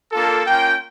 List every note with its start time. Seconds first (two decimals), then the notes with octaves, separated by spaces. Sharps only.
0.12 A#3 D4 F4 A4
0.46 A#3 C#4 F4 G5